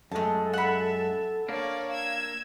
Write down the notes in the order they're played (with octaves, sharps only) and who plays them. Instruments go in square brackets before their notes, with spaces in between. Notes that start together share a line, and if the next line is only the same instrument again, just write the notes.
[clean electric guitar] F#2 G#3 [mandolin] A3 A5 [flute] A4
[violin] E5 [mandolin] F#5 B5
[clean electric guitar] A#3 D4 [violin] C#5 D5 [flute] F5
[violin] E6 G#6